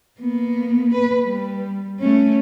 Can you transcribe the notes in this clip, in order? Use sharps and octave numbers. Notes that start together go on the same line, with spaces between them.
A#3 B3
B4
G3
A3 C#4